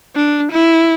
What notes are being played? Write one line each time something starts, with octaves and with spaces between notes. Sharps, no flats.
D4
E4